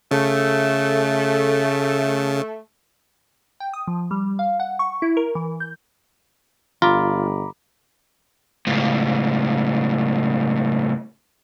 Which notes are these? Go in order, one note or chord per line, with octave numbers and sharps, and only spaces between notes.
C#3 A3
G5
D#6
F3
G3
F5
F#5
C#6
E4
A#4
E3
G6
G1 F4 A#5 B5 D6
C#2 A2